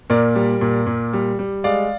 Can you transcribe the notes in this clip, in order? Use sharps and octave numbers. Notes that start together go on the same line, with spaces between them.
A#2 A#4 D5
G3
A#2
A#2
G3
G3
G#3 D5 F5